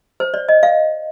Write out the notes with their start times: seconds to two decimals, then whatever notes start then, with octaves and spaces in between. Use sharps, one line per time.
0.20 C5
0.34 D5
0.49 D#5
0.63 F5